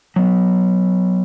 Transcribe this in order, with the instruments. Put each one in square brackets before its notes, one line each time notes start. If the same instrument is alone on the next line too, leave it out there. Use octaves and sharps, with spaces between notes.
[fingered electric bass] F#3 B3